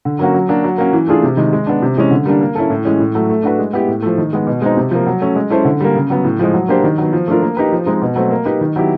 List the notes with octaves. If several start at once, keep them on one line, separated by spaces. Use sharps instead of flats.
D3
F#3 A#3 C#4 F#4
F#3
A#3 D4 F#4
F#3
A#3 C#4 F#4
E3
A3 D4 F4 G#4
C3
D#3 G#3
G#3
B3 D4
C3
E3 G#3 C#4
D3
G3 A#3 D4
A#3
C#4 E4 A4
A2
E3 G#3 C#4
A2
F#3 A3
A3
D4 F#4 B4
G#3
B3 E4 G4
A2
F3 A3
D#3
G#3 B3
B2
G#3 C4 D#4
C3
F3 A#3
F#3
A3 C#4
G#3
C#4 E4 A4 C5
D3
G3 A#3
C#3
F#3 B3
A2
F3 G#3
F#3
A#3 D4 G4 C5
D#3
F#3 B3
F3
A3 D4 F4 A#4
A#3
D#4 G4 B4
F3
G#3 C4 D#4
B2
F#3 A3 C4
A#3
D#4 G4 B4
D#3
F#3 B3 E4 G4